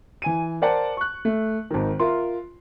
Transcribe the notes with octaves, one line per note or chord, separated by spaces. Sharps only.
E3 G#5 D#7
A#4 C5 D5 F#5 A5
C#6 F#6
A3
G#1 D#3
F4 A#4 E5 C6